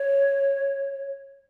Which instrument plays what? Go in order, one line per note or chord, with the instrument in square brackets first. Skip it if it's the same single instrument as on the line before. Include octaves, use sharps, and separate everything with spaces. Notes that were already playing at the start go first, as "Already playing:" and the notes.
Already playing: [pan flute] C#5